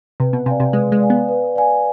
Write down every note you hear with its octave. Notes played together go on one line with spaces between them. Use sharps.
C3 B4
B2
C3 D5 F5 G#5
C3
G#3 B4
G#3
D5 F5 G#5
B3
B4
D5 F5 G#5